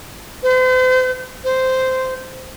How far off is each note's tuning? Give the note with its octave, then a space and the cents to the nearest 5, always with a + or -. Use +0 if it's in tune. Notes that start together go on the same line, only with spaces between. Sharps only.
C5 -40
C5 -10